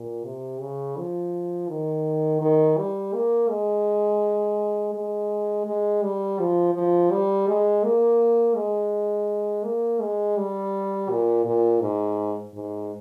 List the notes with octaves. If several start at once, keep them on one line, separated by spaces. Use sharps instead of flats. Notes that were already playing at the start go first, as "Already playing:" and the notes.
Already playing: A#2
C3
C#3
F3
D#3
D#3
G3
A#3
G#3
G#3
G#3
G3
F3
F3
G3
G#3
A#3
G#3
A#3
G#3
G3
A#2
A#2
G#2
G#2